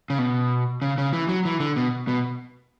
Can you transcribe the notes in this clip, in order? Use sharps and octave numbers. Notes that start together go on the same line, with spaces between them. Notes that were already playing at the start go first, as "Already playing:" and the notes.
C#3
B2
C#3
C#3
E3
F#3
E3
D3
B2
B2